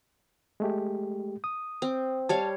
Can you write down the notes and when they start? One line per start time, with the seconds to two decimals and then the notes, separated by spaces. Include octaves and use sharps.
0.60 G#3 A3 G4
1.44 D#6
1.82 C4
2.29 G3 C#5 F5 A5